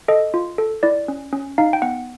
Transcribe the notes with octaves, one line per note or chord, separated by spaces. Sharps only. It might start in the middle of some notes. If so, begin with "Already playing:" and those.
A4 D#5
F4
A4
E4 D5
C#4
C#4
D#4 F5
G5
B3 F#5